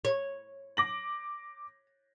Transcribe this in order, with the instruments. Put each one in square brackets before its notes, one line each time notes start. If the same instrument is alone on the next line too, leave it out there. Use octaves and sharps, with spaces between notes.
[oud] C#5
[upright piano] D6 A#6 F#7